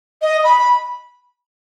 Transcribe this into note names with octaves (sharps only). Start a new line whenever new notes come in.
D#5
B5